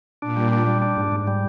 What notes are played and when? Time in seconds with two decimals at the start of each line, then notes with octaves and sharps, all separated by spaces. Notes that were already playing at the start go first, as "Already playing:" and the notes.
0.22 A#2 D4
0.37 G3
0.52 D4
0.67 G3
0.82 D4
0.97 G#2
1.12 G#2
1.27 G3